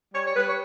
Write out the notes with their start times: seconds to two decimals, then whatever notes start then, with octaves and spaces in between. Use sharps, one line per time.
0.14 G3 C#5
0.26 C#5
0.36 G3 B4
0.47 C#5